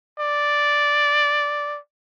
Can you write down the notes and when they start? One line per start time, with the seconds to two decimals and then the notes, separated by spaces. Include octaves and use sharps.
0.20 D5